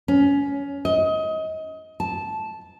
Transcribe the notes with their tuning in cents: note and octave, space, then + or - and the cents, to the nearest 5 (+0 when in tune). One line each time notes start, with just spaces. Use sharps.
C#4 +20
D#5 +25
A5 -10